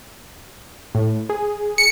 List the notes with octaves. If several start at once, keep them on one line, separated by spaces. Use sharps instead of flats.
A2
G#4
C#7